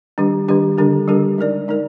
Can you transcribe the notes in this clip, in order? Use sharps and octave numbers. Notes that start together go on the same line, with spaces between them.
D#3 G3 D4 G4
D#3 G3 D4 G4
D3 G3 D4 G4 A#4
D3 G3 D4 G4 A#4
G#3 D#4 A#4 D5
G#3 D#4 A#4 D5